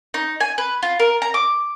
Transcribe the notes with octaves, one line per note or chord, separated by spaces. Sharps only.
D#4
G#5
B4
F4
A#4
A#5
D6